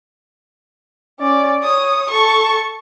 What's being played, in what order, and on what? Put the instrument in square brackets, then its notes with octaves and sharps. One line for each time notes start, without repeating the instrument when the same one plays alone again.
[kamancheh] C#4 D5
[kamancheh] C#5 [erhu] D#6
[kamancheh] A4 A5 [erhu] C#6